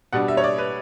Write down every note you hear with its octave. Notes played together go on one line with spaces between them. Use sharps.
B2 G3 D4 F#5
E5
C#5
D5
B4